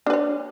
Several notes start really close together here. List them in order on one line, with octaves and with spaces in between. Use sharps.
D4 B4 C#5